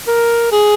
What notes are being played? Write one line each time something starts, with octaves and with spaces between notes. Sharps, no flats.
A#4
G#4